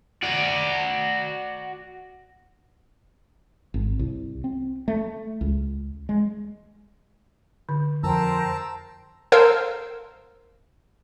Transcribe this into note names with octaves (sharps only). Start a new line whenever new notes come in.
F#4 D5
G#1
C2
C4
A3
C#2
G#3
D3
F2 A#4 C5 G5 A5 A#5 E6
A4 A#4 C5 F5 E6 G6